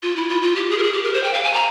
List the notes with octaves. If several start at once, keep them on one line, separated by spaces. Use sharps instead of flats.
F4
E4
F4
F4
G4
G#4
A#4
G#4
G4
A#4
C5
G5
F5
G#5
A#5